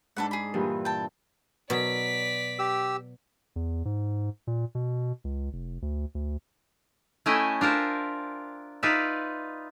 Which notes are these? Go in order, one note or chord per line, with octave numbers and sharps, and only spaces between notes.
G#2 D4 A4 B4 F#5
G#4 B5
G2 A#2 E3
G5 A5
B2 F#3 D5 B6
G4 E6
E2
G#2
A#2
B2
C#2
F1
D2
D2
A3 C#4 E4 D#5 G5 G#5
D4 F4 A#4 C5 E5
D#4 F4 B4 D5 E5